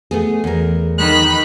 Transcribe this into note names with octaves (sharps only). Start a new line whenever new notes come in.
A3 B3 G#4
E2 A#4
D#3 B5 F#6